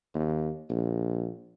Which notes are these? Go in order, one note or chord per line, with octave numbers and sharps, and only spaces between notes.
D#2
A#1